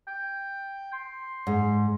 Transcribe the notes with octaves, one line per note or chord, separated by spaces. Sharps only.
G5
C6
G#2